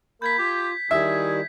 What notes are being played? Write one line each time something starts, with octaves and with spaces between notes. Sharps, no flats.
A#3 A#4 B5 G6 G#6 B6
F4 G4
D#3 G3 E4 G#4 E5 B6